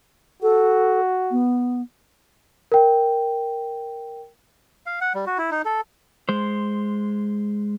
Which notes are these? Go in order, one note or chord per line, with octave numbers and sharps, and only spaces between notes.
F#4 A4
B3
A#4 G5
F5
F#5
G3
F#4
E4
D#4
A4
G#3 C5